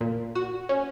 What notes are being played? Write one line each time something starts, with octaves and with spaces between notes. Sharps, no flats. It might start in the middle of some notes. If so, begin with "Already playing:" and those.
A#2
F#4
C#4